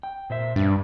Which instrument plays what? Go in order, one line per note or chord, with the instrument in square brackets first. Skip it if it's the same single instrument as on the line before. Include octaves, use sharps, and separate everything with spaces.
[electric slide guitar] G5
A#2 C5 E5
[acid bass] G2 [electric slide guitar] D4